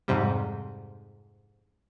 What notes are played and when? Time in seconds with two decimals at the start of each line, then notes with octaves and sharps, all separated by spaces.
0.08 F2 G#2 C3 G3